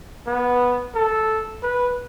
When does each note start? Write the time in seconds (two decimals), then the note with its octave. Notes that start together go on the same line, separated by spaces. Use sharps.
0.26 B3
0.94 A4
1.63 B4